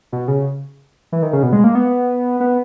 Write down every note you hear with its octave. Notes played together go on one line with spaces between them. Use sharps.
B2
C#3
E3
D#3
C#3
B2
G#3
A#3
B3
B3